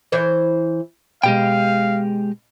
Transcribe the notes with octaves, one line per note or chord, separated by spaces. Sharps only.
E3 C5 C#5
B2 G#3 G4 F5 G5